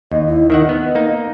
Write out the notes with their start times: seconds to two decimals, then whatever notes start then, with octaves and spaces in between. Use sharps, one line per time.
0.11 D#2 D#5
0.27 E4
0.50 D#3 D#5 E5 F#5
0.69 B3
0.95 A#3 D#4